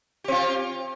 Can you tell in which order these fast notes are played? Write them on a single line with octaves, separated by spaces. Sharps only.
G4 C4 F4